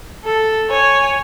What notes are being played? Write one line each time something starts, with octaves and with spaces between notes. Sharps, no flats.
A4
C#5 G#5